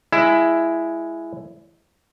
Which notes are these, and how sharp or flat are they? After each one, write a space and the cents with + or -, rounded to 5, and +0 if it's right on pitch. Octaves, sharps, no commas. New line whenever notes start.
G#3 +0 E4 +10